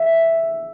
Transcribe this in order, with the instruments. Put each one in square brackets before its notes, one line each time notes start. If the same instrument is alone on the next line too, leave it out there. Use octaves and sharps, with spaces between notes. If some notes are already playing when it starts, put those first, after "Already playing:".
Already playing: [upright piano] E5